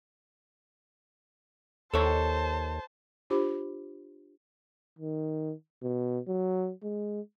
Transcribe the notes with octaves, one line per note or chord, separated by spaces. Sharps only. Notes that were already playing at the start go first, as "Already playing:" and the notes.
D#2 A4 C5 C#5 A5
D4 F4 G4 C5 B5 D6
D#3
B2
F#3
G#3